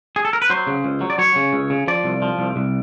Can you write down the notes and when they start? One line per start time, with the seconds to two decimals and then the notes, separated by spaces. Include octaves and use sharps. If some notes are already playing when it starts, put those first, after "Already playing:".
0.16 G#4
0.25 A4
0.33 A#4
0.42 B4
0.50 F#3 C5
0.67 C#3
0.84 C#2
1.01 F#3
1.10 D5
1.18 F#3 C#5
1.36 C#3
1.53 C#2
1.70 C#3
1.88 F3 D5
2.04 C2
2.22 F3
2.39 C2
2.56 C2